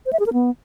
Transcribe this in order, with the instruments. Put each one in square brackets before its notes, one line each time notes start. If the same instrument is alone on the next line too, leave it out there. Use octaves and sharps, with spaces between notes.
[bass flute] C5
E5
G#4
A#4
B3